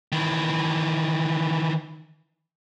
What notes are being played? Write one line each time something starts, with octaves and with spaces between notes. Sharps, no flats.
D#3 E3